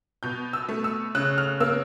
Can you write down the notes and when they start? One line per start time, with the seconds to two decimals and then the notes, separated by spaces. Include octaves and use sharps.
0.23 B2 G6
0.53 E6
0.69 A3
0.84 E6
1.15 C#3 F#6
1.38 F6
1.60 A#3 E6